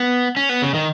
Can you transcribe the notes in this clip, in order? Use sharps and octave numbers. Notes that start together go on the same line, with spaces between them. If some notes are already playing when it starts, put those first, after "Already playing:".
Already playing: B3
C#4
B3
C#3
D#3